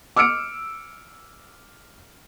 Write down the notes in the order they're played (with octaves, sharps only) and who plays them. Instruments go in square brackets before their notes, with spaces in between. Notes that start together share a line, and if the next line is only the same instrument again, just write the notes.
[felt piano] D6 E6 F6 C#7 D7